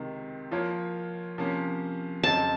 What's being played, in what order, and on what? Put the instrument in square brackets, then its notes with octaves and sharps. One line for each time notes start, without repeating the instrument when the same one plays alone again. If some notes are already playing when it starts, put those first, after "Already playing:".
Already playing: [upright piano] C#2 C3 D#3
F3 A#3 F4 A#4 C#5
C3 F3 A#3 C#4
[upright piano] F2 C#3 F#3 C4 D#4 [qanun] A5